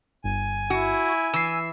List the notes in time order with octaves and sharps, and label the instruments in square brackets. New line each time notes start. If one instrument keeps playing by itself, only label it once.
[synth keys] G1 [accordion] G#5
[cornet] E4 [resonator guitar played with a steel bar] F#4
[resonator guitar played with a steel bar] E3 [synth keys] E6 C7